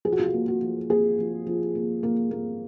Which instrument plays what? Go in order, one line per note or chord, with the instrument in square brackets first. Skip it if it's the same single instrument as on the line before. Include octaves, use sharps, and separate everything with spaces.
[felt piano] F3 G#4
F#4
F4
F#4
A#3
F#4
F3
A#3 G#4
F3
F3
A#3
A#3
A#3